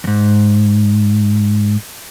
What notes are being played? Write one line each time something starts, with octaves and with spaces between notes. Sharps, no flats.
E2 G#2